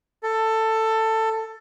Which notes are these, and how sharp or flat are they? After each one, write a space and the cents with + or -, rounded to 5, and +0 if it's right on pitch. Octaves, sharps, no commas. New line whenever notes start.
A4 +15